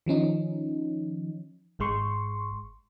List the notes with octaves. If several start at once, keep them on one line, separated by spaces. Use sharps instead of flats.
D#3 F3 C#4 D#4
G#1 G#2 G#3 C6 C#6